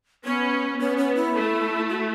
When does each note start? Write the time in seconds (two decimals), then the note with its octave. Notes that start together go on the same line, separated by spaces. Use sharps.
0.24 B3 C#4
0.80 B3 C#4
0.97 C#4
1.15 E4
1.34 A3
1.89 F#4